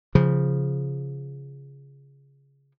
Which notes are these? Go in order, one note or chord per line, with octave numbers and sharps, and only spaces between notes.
C#3 F3